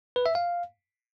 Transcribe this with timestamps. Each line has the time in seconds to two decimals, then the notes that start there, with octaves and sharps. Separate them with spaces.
0.16 B4
0.26 E5
0.35 F5